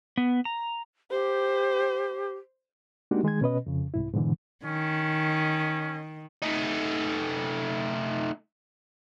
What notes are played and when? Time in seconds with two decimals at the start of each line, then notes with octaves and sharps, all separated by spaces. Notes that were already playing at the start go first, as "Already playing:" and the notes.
0.17 B3
0.45 A#5
1.11 G4 C5
3.11 G#3 A#3 D4 D#4 F#4 G4
3.23 D#3 G#3 G#4 G#6
3.41 B2 C#4 B4 D#5
3.66 F2 C#3
3.94 C2 G#2 E4
4.14 G#2 B2 D3 E3
4.65 D#3 C#4
6.42 A3 D#4